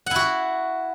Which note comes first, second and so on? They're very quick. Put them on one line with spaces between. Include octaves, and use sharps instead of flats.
F#5 E4 F#4